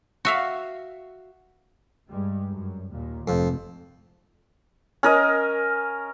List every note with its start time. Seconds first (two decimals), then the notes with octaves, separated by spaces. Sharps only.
0.25 F#4 E5 F5
2.10 G2 G3 G#3
2.52 F#2
2.91 D#2 A#2
3.28 F1 F2 G#2
5.03 C#4 A#4 D#5